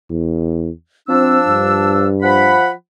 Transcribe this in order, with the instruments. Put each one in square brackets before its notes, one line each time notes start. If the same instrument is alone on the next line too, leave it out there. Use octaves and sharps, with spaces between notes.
[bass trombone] E2
[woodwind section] F3 D4 E6 [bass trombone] C4
[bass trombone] G2
[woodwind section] F3 F#5 B5